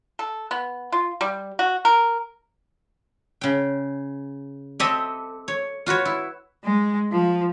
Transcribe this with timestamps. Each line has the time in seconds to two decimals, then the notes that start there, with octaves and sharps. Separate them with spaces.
0.19 A4
0.51 B3
0.92 F4
1.21 G3
1.59 F#4
1.85 A#4
3.41 C#3 G5
4.80 C4 G4 A4 D#5 E5
5.48 C#5
5.86 F4 F#4 B4 C#5
6.05 E4
6.64 G#3
7.12 F3